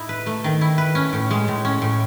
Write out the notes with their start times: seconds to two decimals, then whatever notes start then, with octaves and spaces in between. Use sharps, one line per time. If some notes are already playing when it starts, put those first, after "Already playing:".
Already playing: A2 D#4 E4
0.09 B4
0.26 A3
0.44 D#3
0.61 E4
0.78 B4
0.95 C#4
1.13 A2
1.31 G#3
1.48 A2
1.65 C#4
1.82 A2